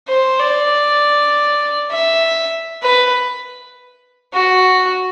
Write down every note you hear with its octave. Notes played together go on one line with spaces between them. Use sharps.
C5
D5
E5
B4
F#4